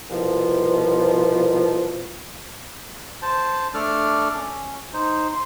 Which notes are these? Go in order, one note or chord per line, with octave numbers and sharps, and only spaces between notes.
C2 B2 F3
C5 A5
A3 D4 A4 D5 F6
C#4
D#4 C5
C6